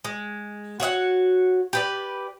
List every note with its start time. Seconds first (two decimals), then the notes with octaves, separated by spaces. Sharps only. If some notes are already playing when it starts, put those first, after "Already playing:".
0.04 G#3
0.80 F#4 C#5 E5 F#5
1.73 G4 B4 D5